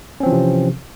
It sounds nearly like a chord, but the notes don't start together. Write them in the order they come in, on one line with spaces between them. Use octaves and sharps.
C#4 C4 F3 E3 C3